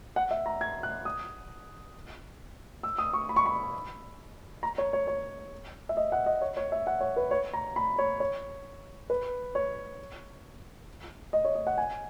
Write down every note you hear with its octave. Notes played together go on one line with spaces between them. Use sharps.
F#5
E5
A#5
G#6
F#6
D#6
E6
D#6
C#6
B5
C#6
B5
A#5
C#5
C#5
C#5
E5
D#5
F#5
D#5
C#5
C#5
E5
F#5
C#5
B4
C#5
A#5
B5
C#5
C#5
B4
C#5
D#5
C#5
D#5
F#5
G#5